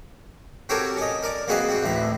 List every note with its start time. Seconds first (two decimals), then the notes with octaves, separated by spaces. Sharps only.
0.69 C4 F#4 G4 A4 A#4 C#5
0.97 C#4 D#5
1.23 A#4 D5
1.48 A#3 C4 F#4 G#4 B4 D#5
1.69 C4 F#4
1.83 A1 D2 A2 B4